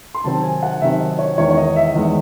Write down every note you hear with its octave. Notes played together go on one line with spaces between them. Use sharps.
C6
C3 D#3 F#3 C4 A5
G#5
F#5
C3 D#3 F#3 C4 E5
D#5
C#5
E2 D#3 G#3 C#5
C#5
D#5
E5
E2 D#3 G#3 D#5